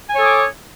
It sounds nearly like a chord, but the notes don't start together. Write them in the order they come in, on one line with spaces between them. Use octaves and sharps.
G#5 C#5 A4 D#6 D6